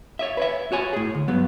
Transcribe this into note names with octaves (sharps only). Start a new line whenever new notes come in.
C#5 D#5 E5
B4 C#5 E5
F#4 C#5 G#5
A2 G#4
D2
G2 F#3 B3